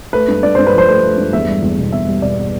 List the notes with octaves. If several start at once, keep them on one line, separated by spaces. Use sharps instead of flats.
A3 B4
G2
G2 D5
G2 C5
B4
F3 C5
A3
A3
G2
E2 E5
G3
E2
B2
B2 E5
G3
B2 D5
B3